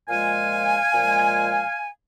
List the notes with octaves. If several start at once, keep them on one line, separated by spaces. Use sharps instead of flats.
A#2 F3 G#3 F5 G#5
A#2 F3 G#3